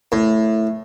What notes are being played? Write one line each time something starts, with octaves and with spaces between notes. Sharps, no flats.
A2